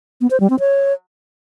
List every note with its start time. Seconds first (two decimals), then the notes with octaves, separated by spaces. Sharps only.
0.21 B3
0.31 C5
0.40 G3
0.50 C4
0.60 C#5